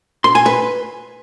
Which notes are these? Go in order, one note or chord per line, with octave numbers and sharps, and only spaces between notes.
C6
G#5
B4